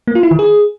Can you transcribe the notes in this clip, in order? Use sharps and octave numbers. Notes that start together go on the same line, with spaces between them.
A#3
F4
E4
D#3
G#4